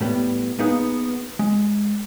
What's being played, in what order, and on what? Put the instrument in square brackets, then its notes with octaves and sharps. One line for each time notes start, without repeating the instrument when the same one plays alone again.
[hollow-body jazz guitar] A2 G3 B3
A#3 B3 D#4 G#4 B4
G#3